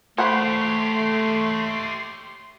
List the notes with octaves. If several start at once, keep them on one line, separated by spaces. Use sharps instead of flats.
A3 G4 C5 C#5 F#5 B5 C6